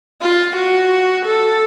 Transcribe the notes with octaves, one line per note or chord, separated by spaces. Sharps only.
F4
F#4
A4